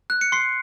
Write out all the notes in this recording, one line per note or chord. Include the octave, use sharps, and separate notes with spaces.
F#6
C#7
C6 C7